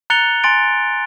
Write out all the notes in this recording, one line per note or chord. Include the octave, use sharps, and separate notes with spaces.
A#5 F#6 A6 C#7 F7 G7
G#5 C6 A6 D7